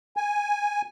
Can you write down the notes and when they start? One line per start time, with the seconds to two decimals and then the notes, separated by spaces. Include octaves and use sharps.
0.17 G#5